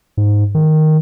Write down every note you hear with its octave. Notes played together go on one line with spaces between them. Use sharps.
G#2
D#3